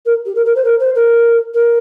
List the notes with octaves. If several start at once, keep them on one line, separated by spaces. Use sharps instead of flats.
A#4
G4
A#4
A#4
C5
A#4
C5
A#4
A#4